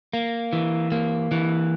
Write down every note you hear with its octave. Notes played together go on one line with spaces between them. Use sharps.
A#3
E3
A#3
E3